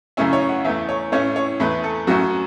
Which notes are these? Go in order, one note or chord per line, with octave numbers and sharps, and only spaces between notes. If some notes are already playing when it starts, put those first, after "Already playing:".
F#2 C#3 A3 C#4 E4 E5
C#5
F#5
E2 E3 A3 E5
C#5
A2 A3 C#4 E4 C#5
C#5
E2 E3 A3 E4 B4
A4
F#2 F#3 A3 C#4 F#4